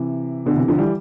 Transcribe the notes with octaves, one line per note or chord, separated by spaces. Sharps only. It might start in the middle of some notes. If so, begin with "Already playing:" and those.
Already playing: C3 E3
B2 D3
C3 E3
D3 F3
E3 G3